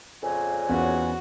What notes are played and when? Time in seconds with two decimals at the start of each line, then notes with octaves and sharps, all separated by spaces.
0.23 F2 A#2 C#3 G#5
0.69 E2 B3 C#4 F#4